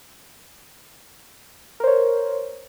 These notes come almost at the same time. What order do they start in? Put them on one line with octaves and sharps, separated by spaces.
A#4 C5 C#5